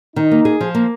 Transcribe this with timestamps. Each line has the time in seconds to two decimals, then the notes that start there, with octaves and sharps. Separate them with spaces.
0.16 D#3 D#4
0.31 A#3
0.45 G#4
0.61 F3
0.75 A#3